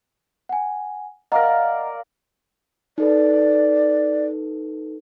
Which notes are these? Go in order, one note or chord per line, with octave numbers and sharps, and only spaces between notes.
F#5 G#5
A#4 D5 D#5 F5 F#5 A#5
D#4 A4 B4 D5